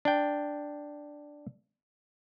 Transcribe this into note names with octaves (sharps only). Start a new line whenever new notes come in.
D4 G5